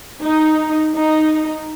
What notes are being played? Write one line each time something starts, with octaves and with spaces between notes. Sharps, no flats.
D#4
D#4